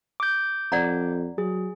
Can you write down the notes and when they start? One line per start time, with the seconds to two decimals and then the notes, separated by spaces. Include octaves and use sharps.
0.20 D6 G6
0.72 F2 D5 F#5 A#5
1.38 F#3 G#4